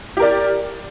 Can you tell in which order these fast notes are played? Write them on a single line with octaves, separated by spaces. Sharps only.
G4 A#4 D5